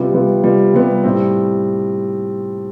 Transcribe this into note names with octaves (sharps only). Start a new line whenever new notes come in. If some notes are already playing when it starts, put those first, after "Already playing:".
Already playing: C3 G3 B3 F4
C3 G3 B3 F4
C3 G3 B3 F4
C3 G3 B3 F4
A2 G3 C4